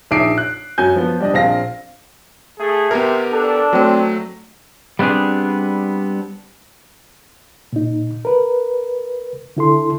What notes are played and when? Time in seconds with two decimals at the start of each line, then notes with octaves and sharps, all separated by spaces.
0.11 A#1 D#4 E5 D6 C7 D7
0.38 F#6
0.78 F#2 F#4 G#5 G6
0.96 F3 B3
1.20 G3 D4 D#5
1.34 A#1 C4 F5 A#6
2.59 A3 G#4
2.91 C3 B3 G4 A#4
3.32 D4 A4
3.73 F#3 A3 C4
4.99 G3 B3 C4 D4 G#4
7.73 A#2 D#4
8.25 A#4 B4
9.57 D3 E4 A4 C6